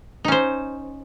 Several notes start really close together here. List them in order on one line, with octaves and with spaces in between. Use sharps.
D#4 C#4 C5